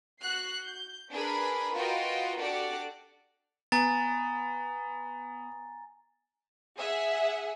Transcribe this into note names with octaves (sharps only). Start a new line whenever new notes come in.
F#4 F#6 C7
G6
D4 G#4 A#4 B4 B5
F4 F#4 A#4 B4 D#5 G5
D4 F#4 G4 A4 D5 F#5
B3 G#5 A#5 A6
G#4 E5 F#5